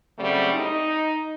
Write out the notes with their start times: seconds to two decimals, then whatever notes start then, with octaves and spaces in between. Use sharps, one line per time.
0.18 C#3 F#3 G3 A3 C4
0.53 D#4